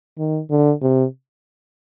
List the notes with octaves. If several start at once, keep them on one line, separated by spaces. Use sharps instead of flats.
D#3
D3
C3